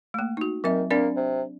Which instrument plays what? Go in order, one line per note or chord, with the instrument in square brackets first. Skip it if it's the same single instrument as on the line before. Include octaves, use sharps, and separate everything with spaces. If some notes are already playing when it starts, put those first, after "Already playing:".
[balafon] A3 A#3
D#4 F#4
[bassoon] D#3 [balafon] F#3 C4 E5
[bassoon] A#3 [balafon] C4 D4 D5
[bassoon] C3